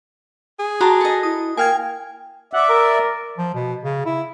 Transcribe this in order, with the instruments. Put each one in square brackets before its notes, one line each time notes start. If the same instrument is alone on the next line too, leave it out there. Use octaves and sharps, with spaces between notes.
[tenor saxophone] G#4
[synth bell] F#4 A5 [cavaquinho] G4 A#5 C6
[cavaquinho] A4 D#5
[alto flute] E4 [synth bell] D#6
[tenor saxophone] A#3 [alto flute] G5 [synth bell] G#5 F6 G#6
[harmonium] D5 E5 [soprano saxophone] F#5
[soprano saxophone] A#4
[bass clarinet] F3
B2
C#3
E4